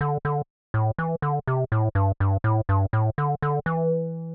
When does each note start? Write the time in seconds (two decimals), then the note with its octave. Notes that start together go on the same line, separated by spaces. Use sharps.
0.01 D3
0.25 D3
0.74 A2
0.98 E3
1.22 D3
1.47 C3
1.72 A2
1.95 G2
2.20 G2
2.44 A2
2.69 G2
2.93 A2
3.18 D3
3.42 D3
3.66 E3